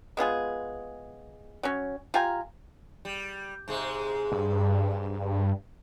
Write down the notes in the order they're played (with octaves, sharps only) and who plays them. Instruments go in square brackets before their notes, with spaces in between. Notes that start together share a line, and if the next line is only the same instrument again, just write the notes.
[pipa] G#3 B3 F4 G#4
F#3 C#4
F4 G4 G#5 A#5
[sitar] G3
G#2 C3 G#3
[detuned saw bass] G2